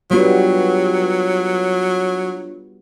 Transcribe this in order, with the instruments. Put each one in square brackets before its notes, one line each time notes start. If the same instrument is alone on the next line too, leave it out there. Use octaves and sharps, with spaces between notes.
[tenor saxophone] F#3 [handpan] G3 B3 F#4 [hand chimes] D4 F4 C#5